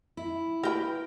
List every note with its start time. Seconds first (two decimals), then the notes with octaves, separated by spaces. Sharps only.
0.17 E4
0.63 G4 A#4 B4 G5